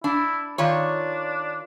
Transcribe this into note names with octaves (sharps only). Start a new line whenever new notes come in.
D4 E4
D#3 D4 F4 C#5